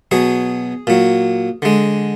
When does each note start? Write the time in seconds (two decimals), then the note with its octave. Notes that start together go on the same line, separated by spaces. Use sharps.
0.11 B2 F#3 G#4
0.87 A#2 F#3
1.62 D3 G#3